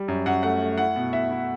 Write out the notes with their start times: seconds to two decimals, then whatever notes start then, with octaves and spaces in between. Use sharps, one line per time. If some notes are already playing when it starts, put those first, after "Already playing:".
Already playing: G3
0.08 F#2
0.26 F#2 F#5
0.43 A3 F#5
0.61 A3
0.78 E4 F#5
0.96 B2
1.13 E4 E5
1.31 E4